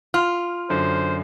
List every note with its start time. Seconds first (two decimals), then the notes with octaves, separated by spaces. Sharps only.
0.14 F4 F6
0.70 F#2 D3 C5